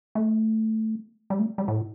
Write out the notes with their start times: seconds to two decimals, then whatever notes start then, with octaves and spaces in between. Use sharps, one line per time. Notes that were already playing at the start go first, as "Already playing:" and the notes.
0.15 A3
1.30 G3
1.39 A3
1.58 G3
1.68 A2